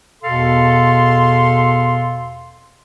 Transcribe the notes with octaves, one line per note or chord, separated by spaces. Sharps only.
E2 B2 A4 F5 C6